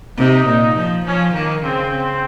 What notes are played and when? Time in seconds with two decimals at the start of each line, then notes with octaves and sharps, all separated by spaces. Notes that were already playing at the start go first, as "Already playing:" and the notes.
0.18 C3 D#4
0.46 A#2
0.76 F3
1.05 F3 C#4
1.33 D#3 A#3
1.62 C#3 C4
1.91 C4